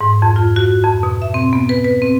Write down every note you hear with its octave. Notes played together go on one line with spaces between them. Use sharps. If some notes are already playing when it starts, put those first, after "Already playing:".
G#2
F2
F4
F#4
F2
B2
E5
C4
B3
B4
B4
C4